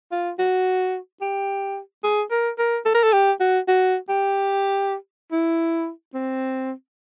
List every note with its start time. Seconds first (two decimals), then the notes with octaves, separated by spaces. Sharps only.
0.12 F4
0.39 F#4
1.21 G4
2.04 G#4
2.31 A#4
2.59 A#4
2.86 A4
2.94 A#4
3.03 A4
3.13 G4
3.40 F#4
3.68 F#4
4.09 G4
5.32 E4
6.14 C4